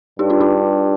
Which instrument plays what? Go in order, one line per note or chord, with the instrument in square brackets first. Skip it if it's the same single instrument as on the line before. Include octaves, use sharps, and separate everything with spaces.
[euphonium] G2 [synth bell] D#4 G4
[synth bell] D4 F4
D4 F4